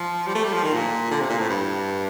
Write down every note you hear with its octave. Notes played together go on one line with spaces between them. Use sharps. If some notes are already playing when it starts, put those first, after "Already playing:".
Already playing: F3
G3
A3
G3
F3
D#3
A#2
D3
C3
A#2
A2
G2